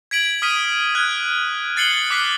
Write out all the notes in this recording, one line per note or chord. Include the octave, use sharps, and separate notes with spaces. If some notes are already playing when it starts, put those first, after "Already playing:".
G#6 B6 D7 F#7
D#6 F6 B6 D#7
F6 F#6 G#6
F#6 A6 C7 C#7 F#7 G7
D6 F#6 B6 C7